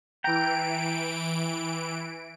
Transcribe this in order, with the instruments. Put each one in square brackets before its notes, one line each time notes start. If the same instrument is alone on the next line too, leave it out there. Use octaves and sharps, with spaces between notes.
[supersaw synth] E3 D7 [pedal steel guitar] G5 A#5